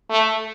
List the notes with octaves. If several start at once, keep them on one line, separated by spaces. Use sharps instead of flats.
A3